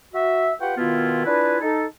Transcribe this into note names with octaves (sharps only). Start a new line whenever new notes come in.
F#4 E5
F4 G4 B4 F#5 G5
B2 D#3 B3 E4 F4
D4 E4 F4 G#4 B4
D#4 A4